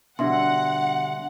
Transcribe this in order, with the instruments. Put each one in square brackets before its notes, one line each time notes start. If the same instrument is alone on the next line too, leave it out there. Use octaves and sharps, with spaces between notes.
[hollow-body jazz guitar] B2 D3 G3 [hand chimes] D4 E5 C6 [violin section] F#5